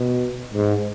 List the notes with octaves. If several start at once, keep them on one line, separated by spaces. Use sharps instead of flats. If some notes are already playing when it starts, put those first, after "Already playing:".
Already playing: B2
G#2